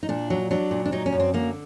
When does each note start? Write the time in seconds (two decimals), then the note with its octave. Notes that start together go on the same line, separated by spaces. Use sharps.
0.03 D#4
0.09 A#2 D4
0.30 F#3
0.51 F#3 D4
0.71 A#2
0.85 D4
0.92 F#3 D#4
1.06 C#4
1.13 F#2
1.20 C4
1.34 D3 A#3